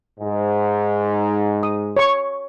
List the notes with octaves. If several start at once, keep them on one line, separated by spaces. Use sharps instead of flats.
G#2
D#6
C#5 C#6